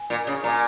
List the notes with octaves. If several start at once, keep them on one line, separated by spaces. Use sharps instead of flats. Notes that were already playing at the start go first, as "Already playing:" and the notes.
Already playing: G#5
A#2
C#3
A#2 A#5
G#5